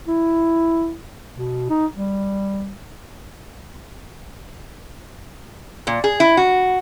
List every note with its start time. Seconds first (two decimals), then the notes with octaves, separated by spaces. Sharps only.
0.07 E4
1.37 B2
1.70 D#4
1.95 G3
5.87 A#2
6.04 G#4
6.20 E4
6.37 F#4